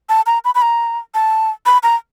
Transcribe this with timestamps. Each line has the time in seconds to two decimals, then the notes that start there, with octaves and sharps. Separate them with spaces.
0.09 A5
0.26 A#5
0.45 B5
0.55 B5
0.62 A#5
1.14 A5
1.66 B5
1.83 A#5